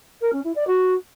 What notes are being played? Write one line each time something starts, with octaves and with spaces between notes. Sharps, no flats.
A#4
C#4
E4
D5
F#4